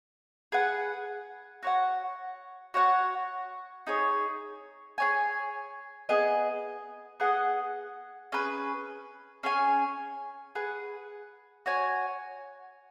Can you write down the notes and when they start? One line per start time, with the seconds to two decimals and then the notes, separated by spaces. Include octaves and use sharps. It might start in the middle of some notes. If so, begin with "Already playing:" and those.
0.52 G#4 B4 F#5
1.63 F#4 C#5 F#5
2.74 F#4 C#5 F#5
3.87 D#4 G#4 C#5
4.98 G#4 C#5 G#5
6.09 B3 G#4 D#5
7.20 B3 G#4 D#5 F#5
8.32 C#4 G#4 B4
9.43 C#4 G#4 C#5 G#5
10.55 G#4 B4 F#5
11.66 F#4 C#5 G#5